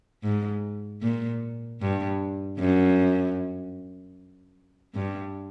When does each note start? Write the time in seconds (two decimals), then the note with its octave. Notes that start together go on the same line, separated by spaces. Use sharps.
0.23 G#2
1.02 A#2
1.81 G2
2.59 F#2
4.95 G2